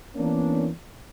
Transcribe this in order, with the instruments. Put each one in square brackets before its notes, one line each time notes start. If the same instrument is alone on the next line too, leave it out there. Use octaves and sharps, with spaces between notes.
[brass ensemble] E3 B3 D4 [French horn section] A#3 C#4